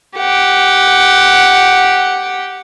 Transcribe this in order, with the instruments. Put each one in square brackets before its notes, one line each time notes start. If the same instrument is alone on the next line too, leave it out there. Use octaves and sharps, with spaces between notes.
[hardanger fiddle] G4 F#5